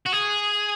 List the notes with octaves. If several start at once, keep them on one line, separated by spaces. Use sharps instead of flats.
F#4
G#4